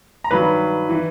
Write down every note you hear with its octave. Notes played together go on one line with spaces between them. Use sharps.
A#5
G2 D#3 F#3 B4 B5
E3